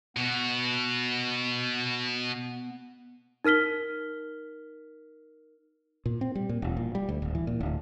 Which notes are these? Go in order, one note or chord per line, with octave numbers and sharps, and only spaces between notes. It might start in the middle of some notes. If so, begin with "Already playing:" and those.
B2 B3 F#4
D#4 A#4 F6 B6 G7
A#2
C4
G3
A#2
E1
A#2
G3
D2
D1
E3
A#2
D1